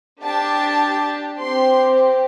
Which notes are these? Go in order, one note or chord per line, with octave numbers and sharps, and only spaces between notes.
D4 G4 A5
C4 G4 C6